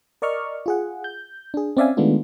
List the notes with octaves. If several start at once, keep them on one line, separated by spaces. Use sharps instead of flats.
A#4 D5 D#5 C#6 F6
F4 G#4 F#5
G6
D4 G#4
C4 C#4 D5 E5 F5 G#5
D#3 G#3 A3 B3 D4 F4